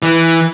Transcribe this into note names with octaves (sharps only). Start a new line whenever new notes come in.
E3